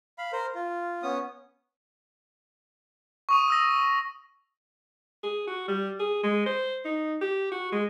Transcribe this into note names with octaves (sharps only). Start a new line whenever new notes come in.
F5 B5
A#4 C5
F4
B3 C#4 D#6
C#6 D#6 D#7
D#6 E6 A#6
G#4
F#4
G3
G#4
G#3
C5
D#4
G4
F#4
G#3